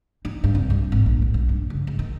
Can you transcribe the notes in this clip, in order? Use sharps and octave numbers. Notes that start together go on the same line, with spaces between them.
D#4
G2
C2
G3
G#1
A#1
D#2
B1
G2
C#3
G#2
D#3